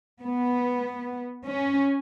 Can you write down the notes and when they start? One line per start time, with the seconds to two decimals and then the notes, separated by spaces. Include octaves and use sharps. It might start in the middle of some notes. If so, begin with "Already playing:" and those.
0.22 B3
1.48 C#4